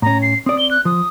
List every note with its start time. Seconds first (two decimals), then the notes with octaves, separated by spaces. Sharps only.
0.02 A2 C#4 A#5
0.22 C7
0.46 C4 D5 D#6
0.59 G7
0.71 F#6
0.85 F3 D#6